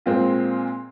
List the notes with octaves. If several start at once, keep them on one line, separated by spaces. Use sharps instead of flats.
A#2 G#3 C4 F4